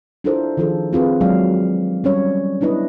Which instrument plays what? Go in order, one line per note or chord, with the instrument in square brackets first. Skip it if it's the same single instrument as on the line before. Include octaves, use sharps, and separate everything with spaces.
[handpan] D4 E4 F4 A4 A#4 C5
D#3 F3 F4 G#4 A4
C4 F4 G#4 B4
F#3 G#3 G#4 D5 F5
G3 C#4 C#5
B3 D4 E4 B4 D#5